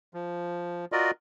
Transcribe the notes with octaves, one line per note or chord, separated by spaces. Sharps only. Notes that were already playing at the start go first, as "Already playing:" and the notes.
F3
F4 F#4 A#4 D5 D#5